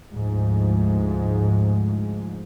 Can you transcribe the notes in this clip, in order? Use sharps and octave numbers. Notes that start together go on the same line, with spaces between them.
D2 G#2 F3 G#3